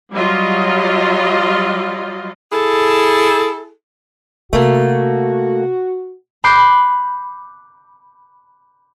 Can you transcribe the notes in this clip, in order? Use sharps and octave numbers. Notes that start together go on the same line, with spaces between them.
F#3 G3 F4 D#5
E4 G#4 A4
C3 A3 A#3 F#4
B5 D6 F#6 G6 C7